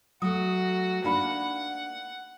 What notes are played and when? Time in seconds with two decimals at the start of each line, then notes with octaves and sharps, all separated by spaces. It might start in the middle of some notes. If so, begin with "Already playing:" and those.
0.22 F#3 A3 F#4 D#6
1.04 A#3 D4 D#4 F5 F#5 B5